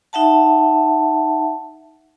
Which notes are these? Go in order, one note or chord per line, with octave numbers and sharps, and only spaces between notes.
D#4 E5 F#5 A5